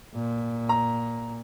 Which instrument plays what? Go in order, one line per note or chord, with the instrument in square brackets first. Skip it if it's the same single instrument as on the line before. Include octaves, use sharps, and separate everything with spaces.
[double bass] A#2
[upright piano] A#5